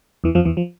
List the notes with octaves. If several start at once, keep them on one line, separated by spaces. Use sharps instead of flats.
E2 E3
F2 F3
E2 E3
F3